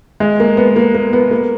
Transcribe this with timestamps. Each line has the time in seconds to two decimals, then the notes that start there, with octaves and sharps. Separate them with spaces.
0.20 G#3
0.40 A#3
0.57 B3
0.76 A#3
0.94 A#3
1.13 B3
1.31 A#3